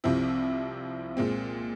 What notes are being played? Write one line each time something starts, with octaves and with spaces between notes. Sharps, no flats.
C2 C3 F3 C4 E4
A#2 G#3 C4